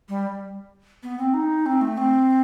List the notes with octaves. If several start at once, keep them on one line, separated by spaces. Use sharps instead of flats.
G3
B3
C4
D#4
C4
A3
C4